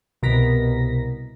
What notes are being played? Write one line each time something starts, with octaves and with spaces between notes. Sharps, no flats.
C2 B2 A#4 A#6 B6